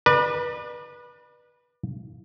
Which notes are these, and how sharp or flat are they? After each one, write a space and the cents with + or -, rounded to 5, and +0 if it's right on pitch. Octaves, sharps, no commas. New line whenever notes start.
B4 -20 D5 +35